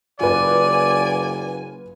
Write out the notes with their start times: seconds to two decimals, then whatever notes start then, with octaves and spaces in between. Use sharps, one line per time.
0.20 F#1 F4 B4 D5 G#5